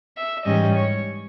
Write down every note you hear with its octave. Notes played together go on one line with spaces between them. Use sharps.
E5
G#2 E3 G3 C#4 D#5
C#5